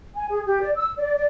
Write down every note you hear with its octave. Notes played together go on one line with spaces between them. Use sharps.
G#5
G#4
G4
D5
E6
D5
D5